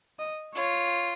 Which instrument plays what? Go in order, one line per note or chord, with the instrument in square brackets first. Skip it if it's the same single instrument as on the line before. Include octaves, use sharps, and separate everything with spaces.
[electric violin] D#5
[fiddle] F4 [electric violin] C#5